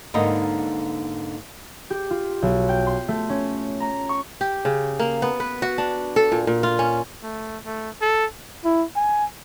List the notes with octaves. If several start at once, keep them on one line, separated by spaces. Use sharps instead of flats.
G#2 D3 A#3 B3 D#4 D#5
G4
F4
B1
G5
C6
A3
C#4
A#5
C#6
G4
C#3
A#3
B3
B4
F#4
D4
A4
A#2
A#2
F4
C#4
A3
A3
A4
E4
G#5